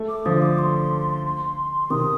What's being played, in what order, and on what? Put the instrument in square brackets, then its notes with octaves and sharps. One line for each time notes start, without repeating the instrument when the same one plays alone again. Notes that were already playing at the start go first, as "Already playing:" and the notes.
Already playing: [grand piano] A3
[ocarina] D6
[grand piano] D3 F3 [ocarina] D#6
[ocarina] D6
C6
[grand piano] C3 D#3 [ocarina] D#6